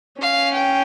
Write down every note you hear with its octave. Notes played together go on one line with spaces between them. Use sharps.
C#4 F5
G5